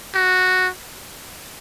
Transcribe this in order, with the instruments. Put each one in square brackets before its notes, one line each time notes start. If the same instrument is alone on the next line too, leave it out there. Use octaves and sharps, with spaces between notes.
[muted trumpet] F#4